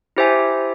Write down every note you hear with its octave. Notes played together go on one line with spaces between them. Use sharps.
E4 G4 C5 E5 G#5